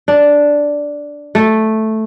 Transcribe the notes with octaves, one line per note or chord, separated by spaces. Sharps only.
D4
A3